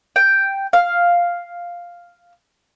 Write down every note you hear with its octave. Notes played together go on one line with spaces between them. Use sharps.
G5
F5